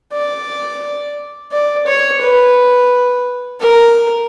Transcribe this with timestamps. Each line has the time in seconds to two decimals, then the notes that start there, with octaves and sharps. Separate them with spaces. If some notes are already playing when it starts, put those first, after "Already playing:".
0.13 D5
1.52 D5
1.86 C#5
2.21 B4
3.60 A#4